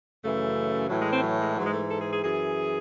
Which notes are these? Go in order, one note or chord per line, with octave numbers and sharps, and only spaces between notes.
F#2 C#3 E3 A3
A2 E3 F#3
G#3
C4
F#3
G#3
G#2 E3 F#3
G#3
A3
A4
G#4
G#4
F#2 E3 G#4